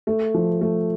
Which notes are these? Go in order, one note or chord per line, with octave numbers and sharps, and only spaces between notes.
A3
F3
A3